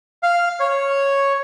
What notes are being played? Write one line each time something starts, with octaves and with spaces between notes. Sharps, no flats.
F5
C#5